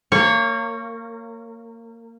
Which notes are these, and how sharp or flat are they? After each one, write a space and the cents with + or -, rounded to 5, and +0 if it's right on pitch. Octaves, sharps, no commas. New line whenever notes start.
A#3 -25 C#5 +0